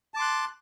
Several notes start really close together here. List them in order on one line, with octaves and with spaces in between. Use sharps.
A5 D6 C6 F#6